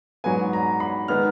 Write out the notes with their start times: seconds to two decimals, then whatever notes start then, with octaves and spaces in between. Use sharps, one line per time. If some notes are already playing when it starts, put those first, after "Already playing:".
0.24 G#2 F#3 B3 G#5
0.53 A#5
0.80 B5
1.08 D#3 G#3 B3 F6